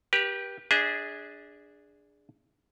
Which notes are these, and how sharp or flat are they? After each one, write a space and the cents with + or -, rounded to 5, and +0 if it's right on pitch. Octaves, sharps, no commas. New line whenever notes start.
G4 +0 B4 -40
D4 +0 G#4 -5 E5 -40